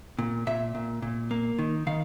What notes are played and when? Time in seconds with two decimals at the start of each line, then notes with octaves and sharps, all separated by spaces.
0.19 A#2
0.47 A#2 E5
0.75 A#2
1.02 A#2
1.31 A#3
1.59 D#3
1.87 D#3 F5